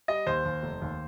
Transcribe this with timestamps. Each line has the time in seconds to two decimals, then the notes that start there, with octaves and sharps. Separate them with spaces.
0.08 G3 D#5
0.27 D#2 C5
0.45 D#2
0.63 F1
0.82 D#2